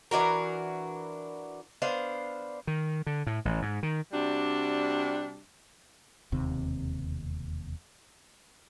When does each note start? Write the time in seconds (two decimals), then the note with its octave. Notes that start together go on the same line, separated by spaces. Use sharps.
0.11 E3 D4 F#4 A#4
1.82 B3 D4 C5 F5
2.67 D#3
3.07 D3
3.27 A2
3.45 A1
3.62 G#2
3.83 D#3
4.12 C3 G3 D4 F#4
6.32 E1 D#2 C3 C4